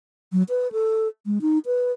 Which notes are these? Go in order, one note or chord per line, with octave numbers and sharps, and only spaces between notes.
F#3
B4
A4
G#3
D#4
B4